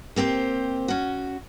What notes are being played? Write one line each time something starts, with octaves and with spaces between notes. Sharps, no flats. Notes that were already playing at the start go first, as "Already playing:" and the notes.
A#3 C4 G4 C5
C#4 F#4